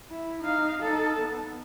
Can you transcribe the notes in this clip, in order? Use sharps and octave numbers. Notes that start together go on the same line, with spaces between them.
E4
D#4 F5
D#4 A4
B3